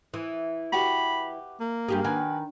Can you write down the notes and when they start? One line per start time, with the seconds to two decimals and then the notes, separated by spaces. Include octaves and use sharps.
0.14 E3 D#6
0.72 F#4 G4 B4 B5
1.60 A#3
1.88 G2 G4 G#4
2.04 D#3 F#4 B4 G#5